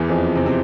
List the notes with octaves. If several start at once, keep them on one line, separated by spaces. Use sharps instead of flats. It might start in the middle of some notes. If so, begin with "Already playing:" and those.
Already playing: E2 E3
F2 F3
C3 C4
C3 C4